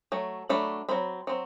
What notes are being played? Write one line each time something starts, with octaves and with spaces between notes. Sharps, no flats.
F#3 A3
F#3 A3 D4 B5
F#3 C4 B5
F#3 C4